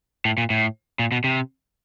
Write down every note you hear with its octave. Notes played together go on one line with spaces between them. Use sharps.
A2
A#2
A2
A#2
B2
C3